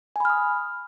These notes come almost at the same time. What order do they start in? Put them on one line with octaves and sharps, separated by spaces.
G#5 B5 F6 D#6